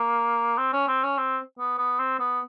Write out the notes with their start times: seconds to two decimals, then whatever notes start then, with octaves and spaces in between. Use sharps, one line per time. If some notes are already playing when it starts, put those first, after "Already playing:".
Already playing: A#3
0.58 C4
0.73 C#4
0.88 C4
1.04 C#4
1.18 C4
1.59 B3
1.78 B3
1.99 C4
2.20 B3